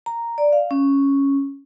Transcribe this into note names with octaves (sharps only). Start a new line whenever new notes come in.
A#5
D5
F5
C#4